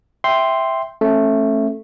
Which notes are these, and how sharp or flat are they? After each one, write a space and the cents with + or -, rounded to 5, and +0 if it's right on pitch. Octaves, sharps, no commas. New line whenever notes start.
E5 +0 G5 +0 C6 +0
A3 +0 C#4 -30